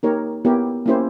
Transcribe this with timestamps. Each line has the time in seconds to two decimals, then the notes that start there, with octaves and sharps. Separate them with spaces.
0.03 A#3 D#4 G4 A#4 C#5
0.45 B3 E4 G4 A#4 C#5
0.86 A#3 C#4 E4 G4 C5